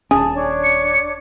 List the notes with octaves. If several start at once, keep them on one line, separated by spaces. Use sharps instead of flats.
D#1 C#4 G#4 A5
D4 C#5 D6
C#7